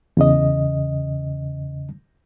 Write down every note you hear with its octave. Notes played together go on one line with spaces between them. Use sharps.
E2 C#3 D#5